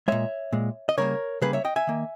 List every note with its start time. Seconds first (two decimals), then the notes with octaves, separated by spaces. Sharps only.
0.08 A#2 G#3 C#5 E5
0.52 A#2 G#3
0.89 D#5
0.97 C#3 G3 A#3 A#4 C#5
1.42 C#3 G3 A#3 G#4 B4
1.53 C#5 E5
1.65 D#5 G5
1.76 E5 G#5
1.87 D#3 A#3